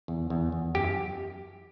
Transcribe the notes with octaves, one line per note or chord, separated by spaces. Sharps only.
E2
E2
E2
F#2 G4